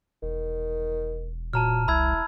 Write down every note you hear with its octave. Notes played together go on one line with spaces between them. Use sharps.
E1 D#3
A#2 F#3 A5 A#5 F6
C2 E4 B5 E6 G#6